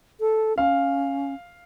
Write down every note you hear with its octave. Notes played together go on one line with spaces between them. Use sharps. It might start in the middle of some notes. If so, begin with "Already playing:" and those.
A4
C#4 F5